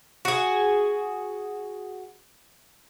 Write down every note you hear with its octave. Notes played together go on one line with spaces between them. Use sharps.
F#4 G#4